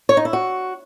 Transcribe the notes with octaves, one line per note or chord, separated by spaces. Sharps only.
C#5
D#4
E4
F#4